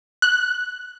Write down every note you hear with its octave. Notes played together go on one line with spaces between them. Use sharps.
F#6